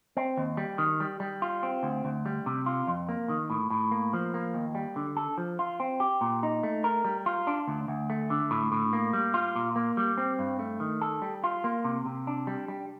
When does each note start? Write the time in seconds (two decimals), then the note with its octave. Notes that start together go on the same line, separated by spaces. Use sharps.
0.17 C4
0.37 D#2
0.57 G3
0.78 D#3
1.00 G3
1.20 G3
1.42 F4
1.63 C4
1.83 D2
2.05 D2
2.26 G3
2.46 C3
2.66 F4
2.87 F2
3.09 A#3
3.29 D#3
3.50 A2
3.70 A2
3.91 A#3
4.13 F3
4.34 A#3
4.54 D#2
4.75 G3
4.96 D3
5.17 A4
5.38 F3
5.59 F4
5.80 C4
6.00 G4
6.21 A#2
6.43 D#4
6.63 A3
6.84 A#4
7.05 G3
7.26 F4
7.47 D4
7.68 D2
7.88 D2
8.10 A3
8.30 D3
8.51 A2
8.72 A2
8.93 A#3
9.13 G3
9.34 F4
9.56 A#2
9.76 A#3
9.97 G3
10.17 C4
10.39 G2
10.59 A3
10.80 D#3
11.01 A4
11.22 G3
11.44 F4
11.64 A#3
11.84 C3
12.06 C3
12.27 D4
12.47 G3
12.68 G3